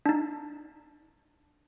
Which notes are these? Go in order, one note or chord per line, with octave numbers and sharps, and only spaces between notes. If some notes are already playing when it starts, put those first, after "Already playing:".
D4 D#4